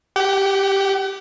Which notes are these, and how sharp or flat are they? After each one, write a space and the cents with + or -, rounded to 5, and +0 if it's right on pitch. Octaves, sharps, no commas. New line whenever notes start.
G4 +0 F#5 +45